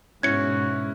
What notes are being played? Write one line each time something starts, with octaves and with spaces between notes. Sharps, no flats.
G#2 B2 C#4 E4 F#4 G#6 C#7